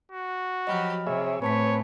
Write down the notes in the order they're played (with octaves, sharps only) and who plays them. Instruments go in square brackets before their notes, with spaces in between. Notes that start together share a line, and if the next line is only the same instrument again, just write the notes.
[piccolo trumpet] F#4
[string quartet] F3 F#3 G4 [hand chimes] D#5 B5 F6
[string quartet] C3 [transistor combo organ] G#4 C#5 E5
[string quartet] A2 [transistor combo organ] C4 B4 [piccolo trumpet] C#5 [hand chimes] G#5 A5 B6